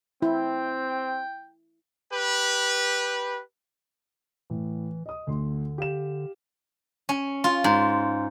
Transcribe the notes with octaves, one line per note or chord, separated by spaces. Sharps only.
C4 E4 G5
G4 B4
A2 E3
D#5 D#6
D2 D3 C6
G4 F5 E7
C#4
F4
G#2